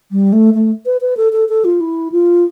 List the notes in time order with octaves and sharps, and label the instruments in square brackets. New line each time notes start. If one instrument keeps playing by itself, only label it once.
[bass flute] G3
A3
A3
B4
B4
A4
A4
A4
F4
E4
F4